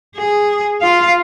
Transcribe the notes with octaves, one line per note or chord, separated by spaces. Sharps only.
G#4
F4 F5